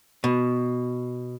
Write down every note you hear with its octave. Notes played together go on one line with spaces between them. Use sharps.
B2